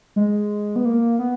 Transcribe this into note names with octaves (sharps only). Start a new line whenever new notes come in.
G#3
B3
A#3
B3